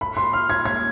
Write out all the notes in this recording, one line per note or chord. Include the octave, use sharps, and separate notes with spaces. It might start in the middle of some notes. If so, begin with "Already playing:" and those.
B5
C6
F6
G#6
G#6